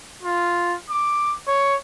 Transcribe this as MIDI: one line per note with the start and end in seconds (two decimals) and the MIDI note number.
0.23 0.75 65
0.90 1.34 86
1.48 1.75 73